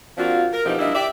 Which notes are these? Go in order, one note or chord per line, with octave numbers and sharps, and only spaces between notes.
F3 A#3 C4 D4 F4 F#4
A#4
B2 E3 F3 C4 D#4 G4
G3 A#3 D4 E4 D#5 E5
G4 D5 E5